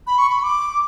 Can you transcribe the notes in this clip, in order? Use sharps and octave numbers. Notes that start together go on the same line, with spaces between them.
B5
C#6
B5
D6